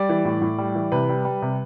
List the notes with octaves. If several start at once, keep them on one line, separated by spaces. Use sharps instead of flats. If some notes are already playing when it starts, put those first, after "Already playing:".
Already playing: G3 D5
E3
A2
A2
G3
E3
C3 B4
G3
G3
C3